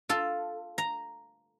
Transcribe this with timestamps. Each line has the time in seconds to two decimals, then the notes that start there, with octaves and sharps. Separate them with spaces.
0.09 F4 A4
0.78 A#5